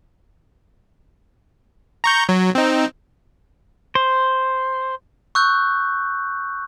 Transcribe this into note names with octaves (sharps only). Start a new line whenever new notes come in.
A#5 C#6 G6
F#3
C4 D#4
C5
C#6 E6 F#6 G6